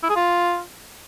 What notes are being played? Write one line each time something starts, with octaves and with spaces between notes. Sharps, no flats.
E4
G#4
F4